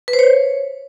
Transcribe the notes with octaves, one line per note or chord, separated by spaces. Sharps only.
B4
C5
C#5